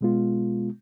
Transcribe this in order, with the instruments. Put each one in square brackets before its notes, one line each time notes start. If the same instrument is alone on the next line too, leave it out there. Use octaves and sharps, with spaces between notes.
[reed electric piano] B2 G#3 B3 F4